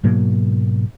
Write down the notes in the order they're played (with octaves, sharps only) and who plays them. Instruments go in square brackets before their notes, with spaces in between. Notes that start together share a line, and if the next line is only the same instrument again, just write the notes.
[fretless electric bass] G#2 B2 F#3 A#3